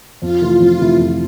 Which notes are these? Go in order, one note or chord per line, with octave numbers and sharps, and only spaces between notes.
F2 F4
C3 E3 A3 E4
F2 F4
C3 E3 A3 E4
F2